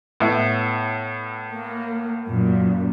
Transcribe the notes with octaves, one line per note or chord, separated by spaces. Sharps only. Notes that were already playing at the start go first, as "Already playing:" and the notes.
A2 B3 E5
A#3
F#2 A#2